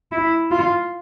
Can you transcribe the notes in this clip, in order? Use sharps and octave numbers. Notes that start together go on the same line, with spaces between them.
E4
F4